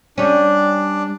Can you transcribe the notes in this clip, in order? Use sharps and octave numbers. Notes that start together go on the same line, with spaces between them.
G3 C#4 D4